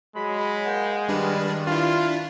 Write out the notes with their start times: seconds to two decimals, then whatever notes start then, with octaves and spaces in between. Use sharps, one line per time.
0.16 F#3 G#3 B5
0.65 A#3 F#5 G5
1.09 G2 D#3 G3 D4 B4
1.67 D4 E4 F4